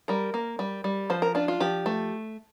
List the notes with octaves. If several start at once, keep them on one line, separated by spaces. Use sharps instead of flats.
G3 A#4
A#3
G3
G3
F3 C5
A#4
D4 F4
F4
F3 G4
A3